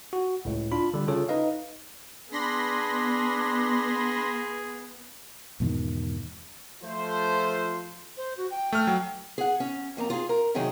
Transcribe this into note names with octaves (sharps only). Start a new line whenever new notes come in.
F#4
C#2 A2
D4 F4 B5
D3 G3
C#3 F4 A4 C#5
D#4 B4 D#5 F5
B3 D4 G#4 B5 C6 A#6
E2 G#2 B2 D#3
F3 A3 F4 A4 C5
C5
F#4
G5
A3 F6
F#3
G#4 F#5
C#4
F2 A#3 C4 A#5
F4 G#4
A#4
C3 D#3 F#3 D#4 G#4